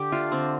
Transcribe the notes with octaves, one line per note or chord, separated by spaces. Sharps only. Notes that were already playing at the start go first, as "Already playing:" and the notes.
Already playing: D3 G4
A3 D4 F4
D3 C4